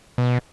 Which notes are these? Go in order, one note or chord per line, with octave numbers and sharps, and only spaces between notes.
B2